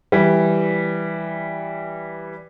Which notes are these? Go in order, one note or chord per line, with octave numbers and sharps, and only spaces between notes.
E3 G3